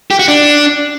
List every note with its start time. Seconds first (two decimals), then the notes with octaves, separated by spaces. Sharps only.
0.11 G4
0.19 F#4
0.28 D4